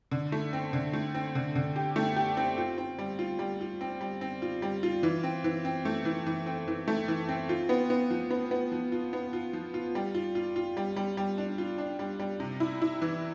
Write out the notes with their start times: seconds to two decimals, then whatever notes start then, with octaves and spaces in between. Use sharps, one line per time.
0.11 D3
0.32 A3
0.53 C4
0.73 D3
0.93 A3
1.14 C4
1.35 D3
1.55 D3
1.76 G4
1.96 A3
2.16 G4
2.37 C4
2.58 F4
2.78 C4
2.98 G3
3.19 F4
3.39 G3
3.61 F4
3.81 C4
4.01 G3
4.21 C4
4.42 F4
4.62 G3
4.83 F4
5.03 E3
5.24 C4
5.44 E3
5.65 C4
5.85 A3
6.05 E3
6.26 E3
6.46 C4
6.68 E3
6.88 A3
7.08 E3
7.29 C4
7.49 F4
7.69 B3
7.90 B3
8.10 F3
8.30 B3
8.51 B3
8.72 F3
8.92 F4
9.13 B3
9.33 F4
9.53 F3
9.74 F4
9.95 G3
10.15 F4
10.35 F4
10.56 F4
10.77 G3
10.96 G3
11.17 G3
11.38 D4
11.58 F4
11.78 D4
11.99 G3
12.19 G3
12.40 C3
12.60 E4
12.82 E4
13.02 E3